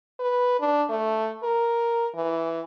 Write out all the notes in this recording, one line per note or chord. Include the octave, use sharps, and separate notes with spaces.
B4
D4
A3
A#4
E3